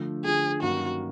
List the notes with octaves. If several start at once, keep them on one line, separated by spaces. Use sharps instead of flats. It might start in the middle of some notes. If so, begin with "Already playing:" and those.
Already playing: D3 F3 A3
D3 F3 A3 G#4
G2 D#3 F#3 A#3 C#4 F#4